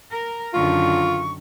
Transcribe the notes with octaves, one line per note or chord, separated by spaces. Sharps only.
A#4
F#2 D3 D#3 F4 C#6